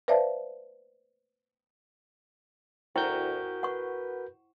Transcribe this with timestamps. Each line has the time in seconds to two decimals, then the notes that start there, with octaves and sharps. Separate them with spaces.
0.08 B4 C5 D5 E5 F5 A5
2.96 D2 E4 F#4 A#4 C5 G5 G6
3.63 B4 F#5 C#6